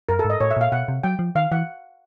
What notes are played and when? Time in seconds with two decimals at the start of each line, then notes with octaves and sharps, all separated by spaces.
0.09 F#2 A#4
0.19 A4
0.25 G#2
0.30 D#5
0.40 A2 C#5
0.51 E5
0.57 A#2 F5
0.72 B2 F#5
0.88 C3
1.04 F#3 G5
1.19 F3
1.35 D#3 F5
1.52 E3 F#5